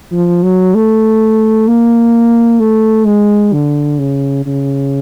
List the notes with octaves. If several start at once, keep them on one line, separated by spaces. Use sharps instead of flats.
F3
F#3
A3
A#3
A3
G#3
D3
C#3
C#3